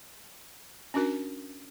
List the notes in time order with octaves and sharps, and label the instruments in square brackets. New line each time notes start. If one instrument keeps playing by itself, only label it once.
[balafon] C#4 D4 F#4 A#4